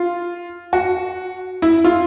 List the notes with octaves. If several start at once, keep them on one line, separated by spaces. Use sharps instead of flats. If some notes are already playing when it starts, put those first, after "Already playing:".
Already playing: F4
F#4
E4
F4